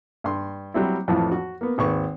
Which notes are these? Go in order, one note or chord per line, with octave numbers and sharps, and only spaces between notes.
G2 C6
F#3 G3 C4 E4
F2 A2 E3 F3
F#4
A#3 B3
G#1 D#2 D#3 B4 C#6